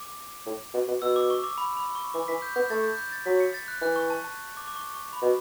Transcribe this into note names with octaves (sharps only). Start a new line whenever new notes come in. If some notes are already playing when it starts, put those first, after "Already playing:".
Already playing: D6
A2
B2
B2
B2 E6
D6
C#6
D6
B5
B5
C#6
E3 D6
E3 B6
G6
B3 G6
A3 A6
G6
G6
A6
F#3 B6
C#7
A6
F#6
E3 F#6
C#6
A5
A5
D6
D6
C#6
C#6
B5
B2